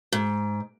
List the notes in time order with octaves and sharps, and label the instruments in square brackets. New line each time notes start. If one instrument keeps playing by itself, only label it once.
[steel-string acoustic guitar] G#2